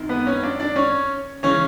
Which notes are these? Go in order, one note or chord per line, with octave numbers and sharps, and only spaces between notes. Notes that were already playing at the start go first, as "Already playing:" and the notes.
Already playing: F#2 D#3 C4
B3 B4
C#4 C#5
D4 D5
D4 D5
C#4 C#5
C#3 E3 C#4 C#5